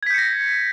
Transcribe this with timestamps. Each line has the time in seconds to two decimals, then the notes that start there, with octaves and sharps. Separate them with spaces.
0.03 G#6
0.06 B6
0.10 G6
0.14 C#7
0.18 A#6